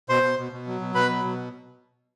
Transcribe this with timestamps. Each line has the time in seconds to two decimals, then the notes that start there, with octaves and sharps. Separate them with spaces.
0.09 B2 C5 C6
0.23 B2
0.38 B2
0.52 B2
0.67 F#3
0.81 B2
0.95 B2 B4 B5
1.10 F#3
1.24 B2